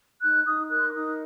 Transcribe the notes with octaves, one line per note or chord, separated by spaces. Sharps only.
D#4 F#6
D#4 D#6
A#4 F#6
C6
D6
D#4 D#6